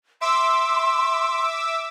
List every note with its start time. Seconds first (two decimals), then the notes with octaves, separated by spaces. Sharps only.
0.21 E5 C6 D6 E6